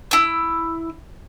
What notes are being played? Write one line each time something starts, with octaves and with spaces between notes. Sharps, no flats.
E4 E6